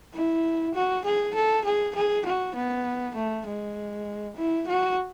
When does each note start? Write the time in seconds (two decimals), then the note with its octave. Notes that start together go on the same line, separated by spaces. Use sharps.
0.14 E4
0.75 F#4
1.05 G#4
1.35 A4
1.65 G#4
1.95 G#4
2.26 F#4
2.55 B3
3.15 A3
3.46 G#3
4.37 E4
4.68 F#4